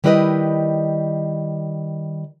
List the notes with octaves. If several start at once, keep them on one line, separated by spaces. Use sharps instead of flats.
D#3 G3 E4 B4 C5 D#5